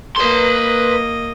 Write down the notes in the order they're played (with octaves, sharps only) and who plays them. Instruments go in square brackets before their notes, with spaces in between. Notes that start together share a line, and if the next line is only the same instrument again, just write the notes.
[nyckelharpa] A#3 D#5 [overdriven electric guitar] B4 C6